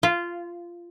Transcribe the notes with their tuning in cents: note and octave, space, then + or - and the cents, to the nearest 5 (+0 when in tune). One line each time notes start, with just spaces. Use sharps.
F4 -15